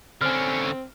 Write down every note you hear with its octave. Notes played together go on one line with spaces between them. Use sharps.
D3 C4 C#4 F6